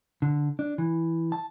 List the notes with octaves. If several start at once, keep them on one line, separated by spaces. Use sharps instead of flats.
D3
D4
E3
A5